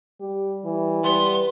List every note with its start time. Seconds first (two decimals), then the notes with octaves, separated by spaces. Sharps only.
0.21 G3 G4
0.65 E3
1.04 G3 B3 C6